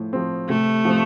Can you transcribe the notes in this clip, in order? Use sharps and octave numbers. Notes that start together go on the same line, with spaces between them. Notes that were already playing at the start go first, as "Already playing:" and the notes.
Already playing: A2 F3
F3 C4
C3 A3
F3 C4